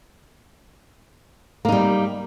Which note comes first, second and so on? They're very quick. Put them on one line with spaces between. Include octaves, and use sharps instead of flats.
A#3 D#4 G3